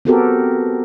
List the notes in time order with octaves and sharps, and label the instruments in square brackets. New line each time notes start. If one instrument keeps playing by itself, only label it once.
[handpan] B3 C4 F#4 G4 A4 A#4